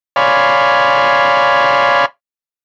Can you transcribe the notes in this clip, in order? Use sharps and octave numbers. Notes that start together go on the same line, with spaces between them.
C#5 D5 F5 G#5 B5 C6